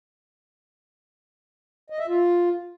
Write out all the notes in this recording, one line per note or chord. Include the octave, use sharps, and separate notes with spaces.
D#5
E5
F4